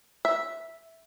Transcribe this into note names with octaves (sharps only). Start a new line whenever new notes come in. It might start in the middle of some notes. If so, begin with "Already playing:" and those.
E5